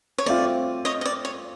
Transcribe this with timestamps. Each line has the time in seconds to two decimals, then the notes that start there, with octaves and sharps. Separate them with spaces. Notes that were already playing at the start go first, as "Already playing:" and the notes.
0.18 C#5
0.26 A3 C4 F4 D5
0.85 C#5 D#5
1.01 D#5
1.06 D5
1.25 C#5